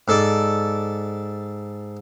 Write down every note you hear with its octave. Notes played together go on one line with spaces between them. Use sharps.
G#2 A4 D5